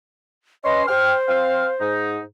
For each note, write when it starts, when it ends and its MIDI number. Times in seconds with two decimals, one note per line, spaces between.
0.64 0.85 61
0.64 0.85 71
0.64 0.83 75
0.64 0.85 84
0.88 1.88 72
0.88 1.13 79
0.88 1.13 89
1.28 1.67 60
1.28 1.67 77
1.81 2.20 44
1.81 2.20 63